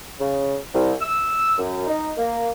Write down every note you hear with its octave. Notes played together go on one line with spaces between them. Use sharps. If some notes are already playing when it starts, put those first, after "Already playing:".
C#3
C2
E6
F#2
D#4
A#3